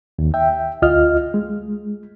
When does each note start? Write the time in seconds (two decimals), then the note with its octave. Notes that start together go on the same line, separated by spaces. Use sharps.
0.19 D#2
0.34 E5 G5
0.82 D2 F4 D#5 F6
1.34 G#3